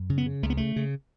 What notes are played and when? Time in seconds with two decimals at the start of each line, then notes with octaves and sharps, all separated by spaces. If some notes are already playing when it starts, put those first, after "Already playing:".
Already playing: F#2
0.10 C#3
0.18 B3
0.26 C#3
0.43 C#2 A3
0.50 B3
0.57 C#3 A3
0.76 C#3